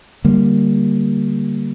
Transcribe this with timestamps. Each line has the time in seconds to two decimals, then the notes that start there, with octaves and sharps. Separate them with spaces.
0.24 D3 G3 A#3